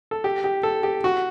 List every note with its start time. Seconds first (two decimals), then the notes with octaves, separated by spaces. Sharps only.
0.11 A4
0.24 G4
0.44 G4
0.63 A4
0.83 G4
1.04 F#4